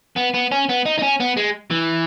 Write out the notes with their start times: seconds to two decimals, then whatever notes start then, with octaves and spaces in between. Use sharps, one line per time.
0.17 B3
0.34 B3
0.52 C#4
0.69 B3
0.86 D#4
0.99 D#4
1.02 C#4
1.20 B3
1.37 G#3
1.71 E3